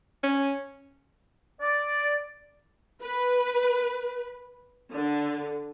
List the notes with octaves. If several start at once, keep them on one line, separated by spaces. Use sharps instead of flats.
C#4
D5
B4
D3